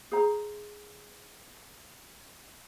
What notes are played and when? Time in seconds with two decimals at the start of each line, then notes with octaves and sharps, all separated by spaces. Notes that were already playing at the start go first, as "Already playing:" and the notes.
0.12 G#4 C5 A#5